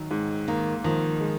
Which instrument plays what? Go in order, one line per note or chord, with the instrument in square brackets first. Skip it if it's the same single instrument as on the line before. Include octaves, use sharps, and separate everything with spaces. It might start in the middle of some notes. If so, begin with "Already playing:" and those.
Already playing: [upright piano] D#3 F#3
G#2
[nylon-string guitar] D#3 [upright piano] A#3
[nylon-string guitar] D#3 [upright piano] F3
[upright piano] G#3